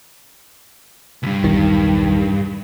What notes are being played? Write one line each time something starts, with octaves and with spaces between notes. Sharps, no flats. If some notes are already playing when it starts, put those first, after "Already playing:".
C#2 G2
B1 E2 D#3